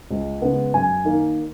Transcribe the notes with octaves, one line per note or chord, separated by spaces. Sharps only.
C#2
C#3 G#3 B3
F#2 G#5
D#3 A#3